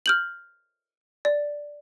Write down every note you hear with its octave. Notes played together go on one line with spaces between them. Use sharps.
F6 G6 F#7
D5